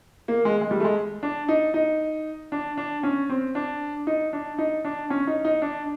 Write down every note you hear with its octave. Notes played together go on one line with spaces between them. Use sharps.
A#3
G#3
G#3
G3
A3
G#3
D4
D#4
D#4
D4
D4
C#4
C4
D4
D#4
D4
D#4
D4
C#4
D#4
D#4
D4